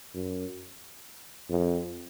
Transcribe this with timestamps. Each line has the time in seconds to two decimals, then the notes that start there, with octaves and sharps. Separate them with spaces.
0.14 F#2
1.49 F2